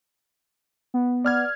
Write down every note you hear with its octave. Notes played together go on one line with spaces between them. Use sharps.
B3
B3 D5 F6 G#6